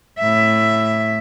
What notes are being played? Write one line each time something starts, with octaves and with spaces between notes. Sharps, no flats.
A2 E5